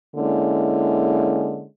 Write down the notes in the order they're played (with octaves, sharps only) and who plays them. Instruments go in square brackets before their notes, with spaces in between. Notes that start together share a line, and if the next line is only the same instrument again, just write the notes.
[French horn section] D3 G#3 A#3 C#4 E4